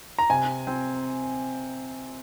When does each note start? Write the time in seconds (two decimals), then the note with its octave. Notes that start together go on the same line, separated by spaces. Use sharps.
0.19 A#5
0.30 C3 G#5
0.67 C4